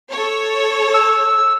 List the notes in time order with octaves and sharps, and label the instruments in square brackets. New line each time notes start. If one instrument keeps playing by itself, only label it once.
[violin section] A4 C#5
[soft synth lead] E6